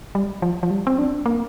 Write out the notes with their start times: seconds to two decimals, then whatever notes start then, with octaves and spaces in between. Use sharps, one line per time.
0.15 G3
0.42 F3
0.63 F3
0.71 G3
0.87 C4
0.99 D4
1.26 A#3